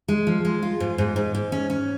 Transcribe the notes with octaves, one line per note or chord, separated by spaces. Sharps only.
G#3
F3
G#3
F4
G#2
G#2
G#2
G#2
C#4
C#4